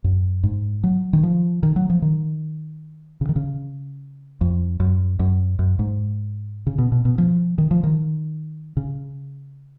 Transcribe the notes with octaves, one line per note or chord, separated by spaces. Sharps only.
F#2
G#2
F#3
D#3
F3
D#3
F#3
F3
D#3
C#3
D#3
C#3
F2
F#2
F#2
F#2
G#2
C#3
B2
B2
B2
F3
D#3
F3
D#3
C#3